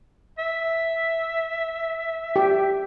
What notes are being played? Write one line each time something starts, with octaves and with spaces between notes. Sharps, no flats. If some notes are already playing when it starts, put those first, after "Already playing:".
E5
G4